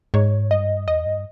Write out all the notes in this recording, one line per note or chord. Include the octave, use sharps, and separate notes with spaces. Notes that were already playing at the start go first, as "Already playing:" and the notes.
G#2 C#5
G2 D#5
E2 D#5
G2